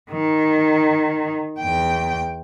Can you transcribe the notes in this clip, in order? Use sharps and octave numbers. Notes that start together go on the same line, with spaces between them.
D#3
E2 G5